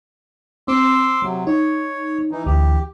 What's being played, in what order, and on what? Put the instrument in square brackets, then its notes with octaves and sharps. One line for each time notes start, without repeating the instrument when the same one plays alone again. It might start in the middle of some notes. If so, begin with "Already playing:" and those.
[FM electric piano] C4 [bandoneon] C6 D6 E6
[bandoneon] C3 F#3
[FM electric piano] D#4 [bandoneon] C#5
[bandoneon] E3 D#4
[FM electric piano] D2 E3 [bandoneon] G4